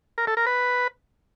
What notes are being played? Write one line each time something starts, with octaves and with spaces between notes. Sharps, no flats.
A#4
A4
A#4
B4